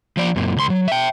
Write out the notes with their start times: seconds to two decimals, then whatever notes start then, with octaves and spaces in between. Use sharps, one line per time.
0.17 F3 D5
0.36 F#2 A#2
0.56 C#2 C6
0.70 F#3
0.88 E5 G5